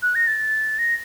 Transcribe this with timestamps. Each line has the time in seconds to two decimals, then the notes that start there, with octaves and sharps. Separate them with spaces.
0.03 F#6
0.15 A#6
0.27 A6
0.79 A#6